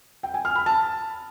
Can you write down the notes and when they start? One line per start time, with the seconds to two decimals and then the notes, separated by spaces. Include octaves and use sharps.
0.23 G5
0.34 G#5
0.45 F6
0.56 B5
0.66 A5